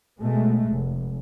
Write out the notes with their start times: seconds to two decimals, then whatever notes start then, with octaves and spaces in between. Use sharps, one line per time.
0.19 B2 G#3 A3
0.71 F1